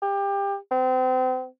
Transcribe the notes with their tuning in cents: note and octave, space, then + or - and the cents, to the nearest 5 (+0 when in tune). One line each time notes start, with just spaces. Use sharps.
G4 +25
C4 -35